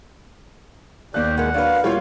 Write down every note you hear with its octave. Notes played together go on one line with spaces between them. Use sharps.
D#2 G4 D5 F5 F#6
E3 G#3 A#4 F#5
F#3 D4 B4 F5
G3 A#3 E4 F4 C#5 F5